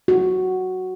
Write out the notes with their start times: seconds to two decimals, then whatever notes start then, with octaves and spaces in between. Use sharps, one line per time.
0.08 F#4